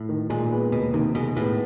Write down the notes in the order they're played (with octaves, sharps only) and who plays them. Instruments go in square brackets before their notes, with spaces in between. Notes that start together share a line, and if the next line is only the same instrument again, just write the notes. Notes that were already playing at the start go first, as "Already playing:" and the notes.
Already playing: [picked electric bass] A2
[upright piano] D#3
[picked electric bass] A#2 [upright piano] G#3
[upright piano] B3
[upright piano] D#2 [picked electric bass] B2
[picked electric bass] C3 [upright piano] D#3
[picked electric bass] B2 [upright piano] G#3
[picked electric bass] A2 [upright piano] B3